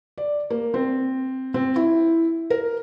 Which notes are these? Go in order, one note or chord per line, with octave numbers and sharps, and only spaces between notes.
D5
A#3
C4
C4
E4
A#4